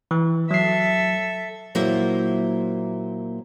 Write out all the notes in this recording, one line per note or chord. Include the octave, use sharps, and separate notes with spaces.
E3
F#3 A4 E5 C7
A#2 F#3 A#3 E4 C5 E5